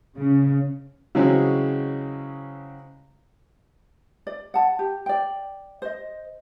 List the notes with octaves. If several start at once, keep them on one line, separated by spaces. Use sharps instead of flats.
C#3
C#3 E3 F#3 G#3 C4 C#4
D5
F#5 A5
G4
D5 G5
C5 D#5